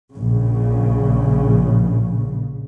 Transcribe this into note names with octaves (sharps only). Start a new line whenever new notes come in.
A#1 C#3